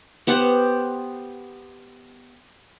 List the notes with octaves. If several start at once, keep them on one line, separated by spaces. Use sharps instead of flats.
B3 G4 C5 F#5